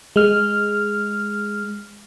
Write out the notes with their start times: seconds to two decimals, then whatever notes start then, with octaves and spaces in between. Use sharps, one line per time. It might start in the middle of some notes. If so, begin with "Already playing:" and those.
0.16 G#3 F6